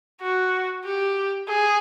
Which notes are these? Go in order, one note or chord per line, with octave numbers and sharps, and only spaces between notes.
F#4
G4
G#4